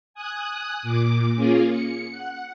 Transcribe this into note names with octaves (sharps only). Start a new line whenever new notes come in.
G#5 D#6 F#6
A#2 D6
A#3 C#4 F4 G#4
C#7
F#5